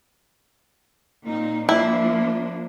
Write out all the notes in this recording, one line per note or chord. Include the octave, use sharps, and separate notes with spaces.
A#2 C4 D#4
F3 A#3 D4 E4